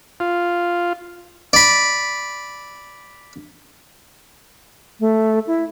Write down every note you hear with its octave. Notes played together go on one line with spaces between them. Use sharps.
F4
D5 B5
A3
E4